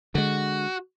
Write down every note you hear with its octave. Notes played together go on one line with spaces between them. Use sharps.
D3 G#3 F#4